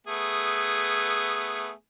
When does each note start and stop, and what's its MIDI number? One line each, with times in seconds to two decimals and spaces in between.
0.07 1.71 57
0.07 1.71 59
0.07 1.71 68